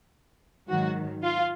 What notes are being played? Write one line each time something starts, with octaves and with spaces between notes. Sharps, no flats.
G#2 D#3 F#3 F#4
F4